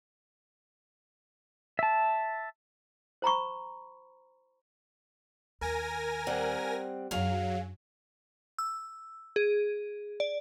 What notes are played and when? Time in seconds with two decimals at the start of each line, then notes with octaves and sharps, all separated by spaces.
1.79 E5 A5
3.22 C5 A#5 B5 C#6
5.61 D#2 A#4 G#5 A#6
6.27 G3 C4 F#5
7.11 F#2 F#3 D4 G#4 F5
8.58 E6
9.36 G#4
10.20 D5